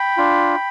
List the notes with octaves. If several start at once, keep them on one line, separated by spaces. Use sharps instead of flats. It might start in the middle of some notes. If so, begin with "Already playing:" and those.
Already playing: G5 B5
D4 F4